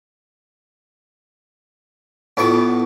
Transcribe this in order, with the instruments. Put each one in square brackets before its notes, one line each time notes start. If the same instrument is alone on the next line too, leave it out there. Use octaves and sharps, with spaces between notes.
[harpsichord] A2 B3 C#6 [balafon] E4 F4